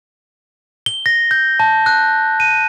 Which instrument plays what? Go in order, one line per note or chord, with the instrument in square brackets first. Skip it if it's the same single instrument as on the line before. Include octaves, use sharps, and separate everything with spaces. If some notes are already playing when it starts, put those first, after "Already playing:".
[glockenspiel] G7
A#6
G6
A5
F#6
D#7